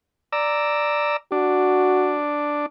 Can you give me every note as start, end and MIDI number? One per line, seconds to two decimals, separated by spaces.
0.32 1.17 74
0.32 1.17 82
0.32 1.17 88
1.32 2.66 62
1.32 2.19 66